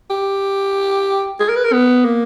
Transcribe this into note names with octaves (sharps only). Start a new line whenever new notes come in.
G4
G#4
A#4
B4
A#4
B3
A#3